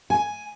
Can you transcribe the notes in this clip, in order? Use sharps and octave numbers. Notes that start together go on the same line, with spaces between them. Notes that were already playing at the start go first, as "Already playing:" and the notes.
G#5